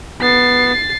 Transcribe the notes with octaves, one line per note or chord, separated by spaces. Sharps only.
B3 A6 C7